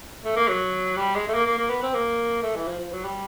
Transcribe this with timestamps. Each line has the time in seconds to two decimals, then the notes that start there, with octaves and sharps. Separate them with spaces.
0.25 A3
0.36 A#3
0.48 F#3
0.97 G3
1.15 G#3
1.28 A3
1.34 A#3
1.46 A#3
1.58 A#3
1.70 B3
1.83 C4
1.94 A#3
2.43 A3
2.56 E3
2.68 F3
2.80 F3
2.92 F#3
3.04 G3